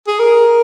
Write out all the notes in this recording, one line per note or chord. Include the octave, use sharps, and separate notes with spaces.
G#4
A#4